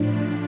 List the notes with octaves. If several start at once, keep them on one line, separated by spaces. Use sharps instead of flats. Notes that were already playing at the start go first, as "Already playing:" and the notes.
Already playing: A2 F3 D4